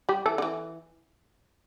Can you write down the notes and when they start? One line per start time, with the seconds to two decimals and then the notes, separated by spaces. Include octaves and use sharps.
0.09 G3 G4
0.26 E3 A4
0.38 D3
0.42 E3